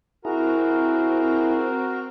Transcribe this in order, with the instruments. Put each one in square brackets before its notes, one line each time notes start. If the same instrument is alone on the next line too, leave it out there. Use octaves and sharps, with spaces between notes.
[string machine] C4 [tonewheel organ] E4 G#4 [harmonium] F#4 A#4 A#5